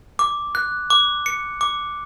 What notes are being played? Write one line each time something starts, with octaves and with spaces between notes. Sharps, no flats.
D6
F#6
D6
C#7
D6